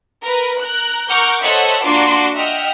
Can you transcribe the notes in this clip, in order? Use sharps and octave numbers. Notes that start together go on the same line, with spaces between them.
A#4 B4
A#4 F#6
A#4 F#5 C#6 D6 F6 G6
A4 C5 C#5 D#5 E5 F#5
A#3 D4 F4 F#4 C6 D6
D#5 E5 F#5 G5 F6